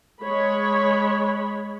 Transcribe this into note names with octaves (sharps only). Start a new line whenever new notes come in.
G#3 C#5 B5